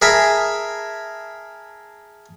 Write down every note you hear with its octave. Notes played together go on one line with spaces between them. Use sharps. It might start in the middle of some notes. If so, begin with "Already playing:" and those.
G#4 A#4 E5 G#5 A5 B5